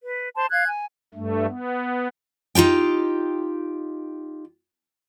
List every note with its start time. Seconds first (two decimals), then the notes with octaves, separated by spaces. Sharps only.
0.01 B4
0.36 C5 A5 C6
0.51 F5 F#6 G#6
0.68 G#5
1.14 G2 A3
1.48 B3
2.55 D#4 F4 G4 G5